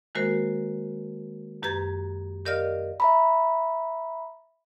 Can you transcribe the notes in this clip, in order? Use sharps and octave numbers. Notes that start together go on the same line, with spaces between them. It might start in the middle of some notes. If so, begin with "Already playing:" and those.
D#3 G#3 A#3 F#4 A#4 C5
F#2 G4 B4 A#5 G#6 A6
G4 A#4 D5 D#5 F5 F6
E5 A#5 B5